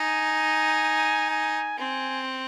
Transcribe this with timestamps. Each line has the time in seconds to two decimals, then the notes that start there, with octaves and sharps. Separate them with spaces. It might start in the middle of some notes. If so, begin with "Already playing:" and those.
Already playing: D#4 G#5
1.30 G#5
1.78 C4 G#5